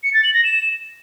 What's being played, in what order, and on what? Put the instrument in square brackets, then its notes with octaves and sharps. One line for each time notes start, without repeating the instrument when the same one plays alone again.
[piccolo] C#7
A6
F#7
A#6
E7